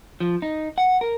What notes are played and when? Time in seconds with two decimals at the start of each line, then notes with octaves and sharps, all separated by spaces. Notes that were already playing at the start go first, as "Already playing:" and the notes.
0.20 F3
0.42 D#4
0.78 F#5
1.01 A#4